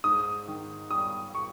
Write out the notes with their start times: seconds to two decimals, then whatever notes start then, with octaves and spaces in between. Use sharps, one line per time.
0.04 G#2 D#6
0.48 D#3
0.91 G3 D#6
1.35 C#6